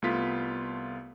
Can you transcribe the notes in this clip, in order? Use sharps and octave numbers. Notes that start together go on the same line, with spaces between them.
C2 A3 B3 F4 B6